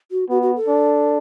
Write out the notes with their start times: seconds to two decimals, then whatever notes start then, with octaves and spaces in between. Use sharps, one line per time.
0.11 F#4
0.29 B3 F#4
0.42 F#4
0.56 A4
0.68 D4